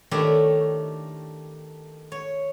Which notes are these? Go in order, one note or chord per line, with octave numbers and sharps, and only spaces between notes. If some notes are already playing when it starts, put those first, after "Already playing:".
D#3 A3 D4 E4 G4 C#5
C#5